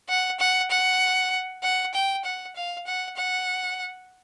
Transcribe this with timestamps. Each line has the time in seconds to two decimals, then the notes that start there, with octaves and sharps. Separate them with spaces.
0.09 F#5
0.40 F#5
0.71 F#5
1.63 F#5
1.94 G5
2.24 F#5
2.56 F5
2.87 F#5
3.17 F#5